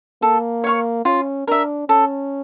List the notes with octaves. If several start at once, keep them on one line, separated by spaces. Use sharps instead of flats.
A#3 A4
C#5 F5 C#6
C#4 F4
D4 A#4 E5
C#4 A4